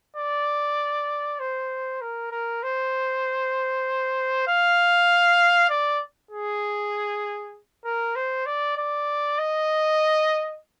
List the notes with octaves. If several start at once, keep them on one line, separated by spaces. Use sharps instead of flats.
D5
C5
A#4
A#4
C5
F5
D5
G#4
A#4
C5
D5
D5
D#5